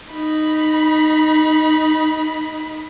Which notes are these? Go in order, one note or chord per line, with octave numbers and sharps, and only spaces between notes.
D#4 B5